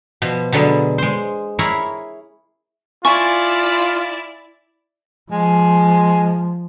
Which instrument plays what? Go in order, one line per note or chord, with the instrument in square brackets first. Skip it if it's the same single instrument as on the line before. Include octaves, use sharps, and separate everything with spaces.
[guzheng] B2 F3
B2 D3 F#3 G#3 B3
G#3 C5
E4 G#4 A#4 C#5 B5
[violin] E4 D5 [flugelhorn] F4 [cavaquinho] G#5 [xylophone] C#6
[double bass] F3 [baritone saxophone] G#3